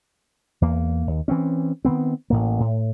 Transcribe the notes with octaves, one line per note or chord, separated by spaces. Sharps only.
E2 A#3
D#2
E3 C4 C#4
D#3 E3 B3 C4
A1 A2 A#3
A2